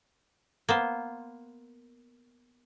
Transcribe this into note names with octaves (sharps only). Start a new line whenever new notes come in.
A#3 B3 C5